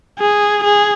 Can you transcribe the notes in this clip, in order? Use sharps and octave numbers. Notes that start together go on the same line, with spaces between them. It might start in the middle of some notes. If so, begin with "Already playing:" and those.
G#4
G#4